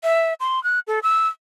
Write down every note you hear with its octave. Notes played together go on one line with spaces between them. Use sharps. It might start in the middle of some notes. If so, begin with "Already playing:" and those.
E5
C6
F#6
A4
E6